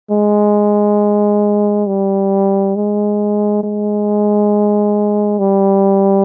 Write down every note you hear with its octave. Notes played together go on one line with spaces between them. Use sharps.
G#3
G3
G#3
G#3
G3